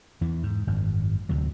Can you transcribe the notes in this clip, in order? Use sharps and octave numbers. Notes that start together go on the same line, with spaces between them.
E2 E3
G#2
G#1 F#2
D2 C3 F#3